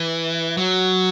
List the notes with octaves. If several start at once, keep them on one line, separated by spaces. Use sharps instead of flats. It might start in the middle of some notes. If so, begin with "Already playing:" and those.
Already playing: E3
F#3